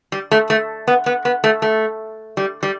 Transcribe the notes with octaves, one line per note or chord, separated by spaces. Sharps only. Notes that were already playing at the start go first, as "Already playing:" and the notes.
G3
A3
A3
B3
B3
B3
A3
A3
G3
G3